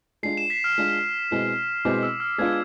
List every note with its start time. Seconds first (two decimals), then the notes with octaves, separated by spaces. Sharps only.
0.23 G#3 D4 F4 C7
0.37 E7
0.50 B6
0.64 F6
0.78 G#3 D4 F4
1.31 B2 G#3 C4 E4
1.85 B2 G#3 C4 E4 D6
2.03 E6
2.20 F6
2.38 G#3 B3 D4 F4 G#6